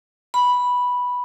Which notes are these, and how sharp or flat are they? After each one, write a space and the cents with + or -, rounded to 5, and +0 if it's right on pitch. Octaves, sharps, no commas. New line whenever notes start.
B5 -5